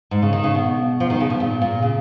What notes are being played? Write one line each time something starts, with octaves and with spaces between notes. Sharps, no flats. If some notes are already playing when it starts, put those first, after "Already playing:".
G#2
C#3
D#3
C#3
B2
F3
D#3
C#3
B2
A#2
A#2
C#3